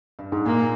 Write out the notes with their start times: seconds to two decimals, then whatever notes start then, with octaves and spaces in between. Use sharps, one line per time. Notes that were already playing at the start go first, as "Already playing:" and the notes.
0.19 G2
0.32 G#2
0.45 A#2 A#3